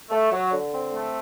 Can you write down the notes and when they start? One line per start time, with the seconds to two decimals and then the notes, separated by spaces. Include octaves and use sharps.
0.10 A3
0.31 F#3
0.52 D3
0.73 C4
0.94 A3